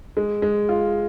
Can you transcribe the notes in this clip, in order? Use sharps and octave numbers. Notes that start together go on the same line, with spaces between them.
G#3
G#3
F4